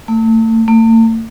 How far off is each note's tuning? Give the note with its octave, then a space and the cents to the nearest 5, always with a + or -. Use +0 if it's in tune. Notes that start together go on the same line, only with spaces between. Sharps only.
A3 +35
A3 +45